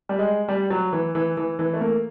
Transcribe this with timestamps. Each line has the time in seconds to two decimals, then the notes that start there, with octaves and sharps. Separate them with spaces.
0.09 G3
0.19 G#3
0.48 G3
0.70 F#3
0.93 E3
1.15 E3
1.37 E3
1.59 E3
1.74 A3
1.81 A#3